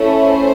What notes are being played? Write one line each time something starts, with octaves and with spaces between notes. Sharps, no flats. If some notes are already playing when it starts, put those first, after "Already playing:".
Already playing: A3 C#4 E4
C5